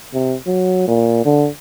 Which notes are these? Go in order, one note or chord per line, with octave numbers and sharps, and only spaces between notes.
C3
F#3
A#2
D3